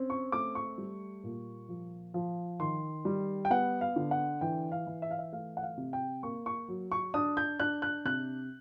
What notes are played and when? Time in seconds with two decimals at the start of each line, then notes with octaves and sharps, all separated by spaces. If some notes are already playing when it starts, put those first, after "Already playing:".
Already playing: C4 C#4
0.10 C#6
0.32 A3 D6
0.55 C#6
0.78 G3
1.24 A#2
1.69 F3
2.14 F3
2.60 D#3 C6
3.05 G3
3.45 G5
3.50 B3 F#5
3.81 F5
3.96 D3
4.11 F#5
4.41 E3 G5
4.72 F5
4.87 E3
5.02 E5
5.11 F5
5.19 E5
5.33 A3 F5
5.57 F#5
5.63 F5
5.77 C3
5.93 G5
6.23 A#3 C#6
6.46 C#6
6.68 F#3
6.92 C#6
7.14 D4 D#6
7.37 G6
7.60 D4 F#6
7.82 F#6
8.05 C3 F#6